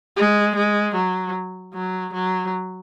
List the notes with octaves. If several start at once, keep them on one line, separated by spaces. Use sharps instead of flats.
G#3
G#3
F#3
F#3
F#3